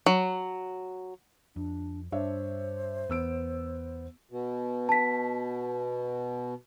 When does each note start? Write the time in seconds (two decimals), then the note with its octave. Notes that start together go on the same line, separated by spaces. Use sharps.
0.06 F#3
1.56 F2 D4
2.12 G2 D4 C5 C#5 E5
3.09 E2 B3 E6 D7
4.31 B2
4.89 A5 B6